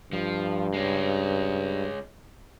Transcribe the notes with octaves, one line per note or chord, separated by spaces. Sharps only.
G2 F3
G#3 C#4